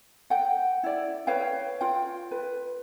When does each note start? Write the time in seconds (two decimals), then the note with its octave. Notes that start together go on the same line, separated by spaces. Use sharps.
0.30 F#5 G5
0.83 E4 D5
1.27 B4 C#5 F5 G5
1.81 F4 G5
2.31 B4